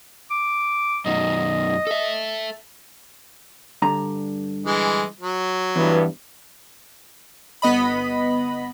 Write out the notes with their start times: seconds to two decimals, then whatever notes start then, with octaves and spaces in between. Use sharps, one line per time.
0.31 D6
1.06 F#2 B2 D#3 D#5
1.87 A4 E5
3.82 G2 D3 A#5
4.66 E3 G#3
5.21 F#3
5.76 E2 G2 E3 B3
7.62 G1 B3 D#5 B5